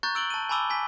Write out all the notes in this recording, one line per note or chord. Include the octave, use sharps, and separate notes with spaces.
A#5 C#6 F#6 G6 A6
E6 D7 F#7 G7
A5 D#7
G#5 A5 B5 D6 E6 G7
G#5 B6